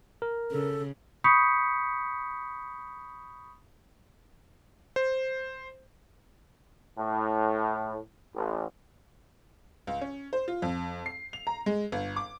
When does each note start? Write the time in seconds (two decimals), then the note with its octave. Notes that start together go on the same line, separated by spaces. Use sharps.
0.22 A#4
0.51 C#3 A4
1.24 B5 C#6 D#6 G6 B6 C#7
4.96 C5
6.98 A2
8.35 A1
9.87 C#2
10.01 C#4
10.33 C5
10.48 F4
10.62 F2
11.06 C7
11.33 F7
11.47 A#5
11.66 G#3
11.92 G1
12.16 D6